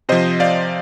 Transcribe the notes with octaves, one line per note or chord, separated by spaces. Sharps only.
C3 F3 C5 D#5
D5 F5